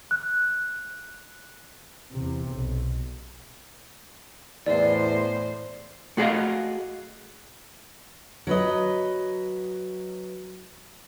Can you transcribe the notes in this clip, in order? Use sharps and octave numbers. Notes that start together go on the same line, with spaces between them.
F#6
E2 C3
B1
E2 A2 C5 D5
A3 F#4 G#4 B4 D#5 F5
F#3 B4 D#5